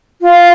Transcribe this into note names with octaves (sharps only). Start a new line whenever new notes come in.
F4